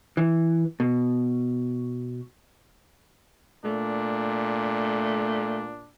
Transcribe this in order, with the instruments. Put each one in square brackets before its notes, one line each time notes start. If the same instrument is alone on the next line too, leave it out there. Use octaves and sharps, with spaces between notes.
[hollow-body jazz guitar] E3
B2
[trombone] A#2 [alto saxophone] A3 [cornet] D4